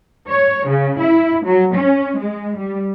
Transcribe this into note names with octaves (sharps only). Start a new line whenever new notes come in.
C#5
C#3
E4
F#3
C#4
G#3
G3